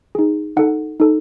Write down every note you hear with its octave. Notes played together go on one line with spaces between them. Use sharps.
D#4 G#4
D#4 A4 F#5
D#4 A4